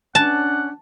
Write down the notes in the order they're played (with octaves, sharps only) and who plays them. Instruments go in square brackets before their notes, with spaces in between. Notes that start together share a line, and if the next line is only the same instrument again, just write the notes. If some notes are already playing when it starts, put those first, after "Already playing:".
[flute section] C#4 D4 [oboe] F#5 [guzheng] A5